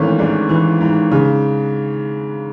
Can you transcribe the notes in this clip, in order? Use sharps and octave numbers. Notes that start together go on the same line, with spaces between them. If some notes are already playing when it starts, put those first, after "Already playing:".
Already playing: G#1 G#2 E3 A3 C#4
G#2 D4
E3
G#2
C#3